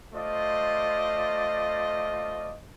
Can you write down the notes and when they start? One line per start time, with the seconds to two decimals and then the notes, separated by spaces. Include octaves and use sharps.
0.14 A3 F4 C5 D5 D#5